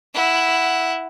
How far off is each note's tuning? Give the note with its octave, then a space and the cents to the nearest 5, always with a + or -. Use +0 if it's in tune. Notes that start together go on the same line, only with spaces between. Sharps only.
E4 +0 F#5 +0